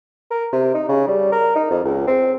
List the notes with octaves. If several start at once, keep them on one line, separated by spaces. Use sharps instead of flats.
A#4
C3
D#4
C#3
G3
A#4
D#4
F2
C#2
C4